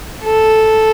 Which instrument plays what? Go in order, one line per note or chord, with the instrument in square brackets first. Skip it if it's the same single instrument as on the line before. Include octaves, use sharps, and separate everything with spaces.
[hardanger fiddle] A4